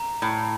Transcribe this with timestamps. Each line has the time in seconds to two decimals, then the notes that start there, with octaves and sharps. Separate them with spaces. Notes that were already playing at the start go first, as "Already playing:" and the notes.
Already playing: A#5
0.22 A2